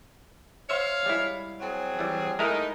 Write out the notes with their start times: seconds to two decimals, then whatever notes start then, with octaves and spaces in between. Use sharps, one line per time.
0.70 C5 C#5 E5 F5
1.06 G3 G#3 E4
1.60 F#3 C4 G#4
1.99 E3 G3
2.39 G#3 A3 D#4 E4 A#4